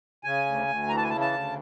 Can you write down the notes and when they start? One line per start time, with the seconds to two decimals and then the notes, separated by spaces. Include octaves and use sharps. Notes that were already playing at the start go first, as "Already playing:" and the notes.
0.24 C#3 G#5
0.46 D2
0.68 D2
0.89 E3 A#5
0.97 A5
1.03 G#5
1.10 C#3 A5
1.21 A5
1.31 D2